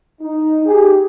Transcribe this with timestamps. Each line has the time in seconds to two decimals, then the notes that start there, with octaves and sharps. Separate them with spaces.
0.21 D#4
0.65 G4 G#4